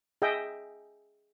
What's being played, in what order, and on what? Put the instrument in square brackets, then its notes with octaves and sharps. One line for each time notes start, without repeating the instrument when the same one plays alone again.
[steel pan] G#4 D#5 E5 G5